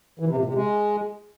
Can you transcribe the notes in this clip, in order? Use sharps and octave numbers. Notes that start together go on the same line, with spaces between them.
E3
C3
A#2
C3
G#3